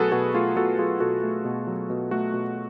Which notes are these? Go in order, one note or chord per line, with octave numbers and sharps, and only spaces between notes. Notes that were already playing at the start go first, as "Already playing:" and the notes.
Already playing: B2 F#3 A3 F#4 G#4 A4 B4
B2 F#4 A4
A3 F4 G#4
B2 F#4 A4
F#3 F4 G#4
B2 F#4 A4
A3
B2
F#3
B2
A3 F#4
B2